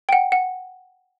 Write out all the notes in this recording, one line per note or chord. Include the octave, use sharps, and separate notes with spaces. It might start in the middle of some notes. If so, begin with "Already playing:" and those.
G5
F#5
F#5